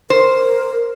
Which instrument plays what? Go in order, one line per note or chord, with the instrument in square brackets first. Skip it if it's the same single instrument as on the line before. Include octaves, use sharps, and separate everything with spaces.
[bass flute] A#4 [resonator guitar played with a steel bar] C5